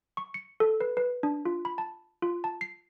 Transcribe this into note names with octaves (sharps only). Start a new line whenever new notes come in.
C#6
C#7
A4
B4
B4
D4
F4
B5
A5
F4
A5
C7